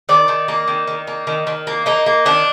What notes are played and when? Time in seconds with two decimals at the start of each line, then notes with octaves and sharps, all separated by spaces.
0.09 D#3 D5
0.28 D#3
0.48 A#3
0.68 D#3
0.87 D#3
1.07 A#3
1.27 D#3
1.47 D#3
1.67 A#3
1.86 A#3 D#4
2.06 A#3
2.25 D#3 D4